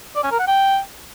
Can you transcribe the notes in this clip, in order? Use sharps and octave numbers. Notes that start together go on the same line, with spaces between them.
D5
C#4
A#4
F#5
G5